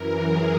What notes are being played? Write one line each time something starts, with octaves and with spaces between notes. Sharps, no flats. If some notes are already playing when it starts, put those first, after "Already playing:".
Already playing: F#2 E3 A#4
G#4